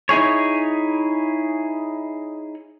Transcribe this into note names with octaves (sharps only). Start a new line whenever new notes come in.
D#4 E4 G#4 C#5